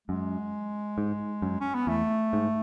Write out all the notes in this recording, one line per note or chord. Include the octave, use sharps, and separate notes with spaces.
F#2 G#3
G#2
F#2
C#4
B3
E2 A3
G#2